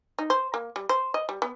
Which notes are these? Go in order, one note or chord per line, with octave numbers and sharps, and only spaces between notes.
D#4
C5
A#3
G3
C5
D#5
G3
B3